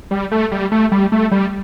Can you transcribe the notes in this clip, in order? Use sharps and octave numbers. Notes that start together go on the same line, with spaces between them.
G3
A3
G3
A3
G3
A3
G3